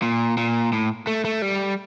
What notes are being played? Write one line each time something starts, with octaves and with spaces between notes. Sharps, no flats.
A#2
A#2
A2
A3
A3
G3